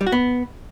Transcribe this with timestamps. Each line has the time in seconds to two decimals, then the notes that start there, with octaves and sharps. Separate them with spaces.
0.01 G3
0.07 F#4
0.12 B3